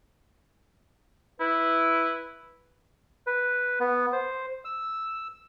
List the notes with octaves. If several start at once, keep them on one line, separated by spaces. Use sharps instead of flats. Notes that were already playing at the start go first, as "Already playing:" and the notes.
E4 B4
B4
B3
C5
E6